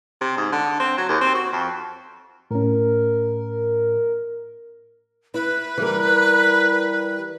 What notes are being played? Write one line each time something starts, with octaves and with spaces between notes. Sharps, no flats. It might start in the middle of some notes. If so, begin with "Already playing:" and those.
C3
G#2
D3
C4
F#3
D#2
C4
F#4
F2
A2 C#4 A#4
E4 B4
E3 G3 A#4